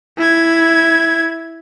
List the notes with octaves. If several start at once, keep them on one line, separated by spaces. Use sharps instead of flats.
E4 G#6